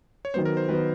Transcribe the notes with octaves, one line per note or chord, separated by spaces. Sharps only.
C#5
D#3 F#3 B3 C5
A#4
C5
D#3 F#3 B3 B4